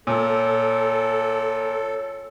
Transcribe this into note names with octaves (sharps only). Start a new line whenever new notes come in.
A#2 A4 C#5